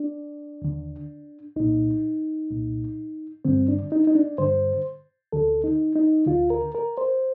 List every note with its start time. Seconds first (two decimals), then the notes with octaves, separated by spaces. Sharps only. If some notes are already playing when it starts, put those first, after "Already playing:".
Already playing: D4
0.62 D#2 D3
1.56 C2 A#2 D#4
2.50 C2 A#2
3.45 G2 D3 C4
3.68 D4
3.92 D#4
4.07 D#4
4.15 D4
4.38 G2 D3 C5
5.32 D2 D3 A4
5.64 D#4
5.96 D#4
6.27 D2 D3 F4
6.50 A#4
6.75 A#4
6.98 C5